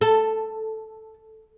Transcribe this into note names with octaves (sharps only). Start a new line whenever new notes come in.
A4